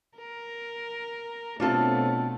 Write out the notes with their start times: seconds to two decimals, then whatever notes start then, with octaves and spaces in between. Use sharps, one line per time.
0.17 A#4
1.60 B2 A3 C4 D4 F4 A4 C#5